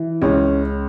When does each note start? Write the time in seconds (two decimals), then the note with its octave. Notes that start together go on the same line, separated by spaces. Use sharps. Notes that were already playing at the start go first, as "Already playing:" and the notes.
Already playing: E3
0.22 C#2 C#4